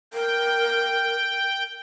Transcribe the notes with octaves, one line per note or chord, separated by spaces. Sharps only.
A#4 G5